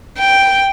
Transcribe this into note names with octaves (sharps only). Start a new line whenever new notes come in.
G5